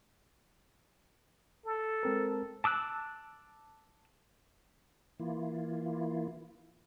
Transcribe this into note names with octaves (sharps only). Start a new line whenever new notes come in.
A4
G#3 C4 A#4
A5 D6 E6 F#6
E3 A#3 E4 F4